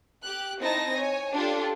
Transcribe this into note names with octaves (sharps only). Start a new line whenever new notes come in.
G4 F#6
C4 D#4 E4 A5 A#6
C#5 G#5
D4 F4 G4 A4